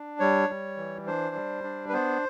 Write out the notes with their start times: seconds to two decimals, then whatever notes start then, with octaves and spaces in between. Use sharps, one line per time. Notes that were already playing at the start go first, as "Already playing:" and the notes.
Already playing: D4
0.20 G3 C#5
0.49 G3
0.77 E3
1.07 D4 C5
1.35 G3
1.64 D4
1.89 B4
1.93 B3 C5